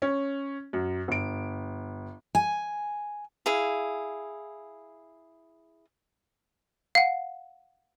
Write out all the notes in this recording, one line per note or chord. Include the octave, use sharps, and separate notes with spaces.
C#4
F#2
G1 D7
G#5
E4 G#4 F5
F5 F#5